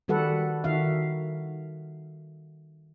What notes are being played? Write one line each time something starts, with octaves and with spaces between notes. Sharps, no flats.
D#3 G3 F#4 A4 B4 F#5
D#3 F#4 E5 F5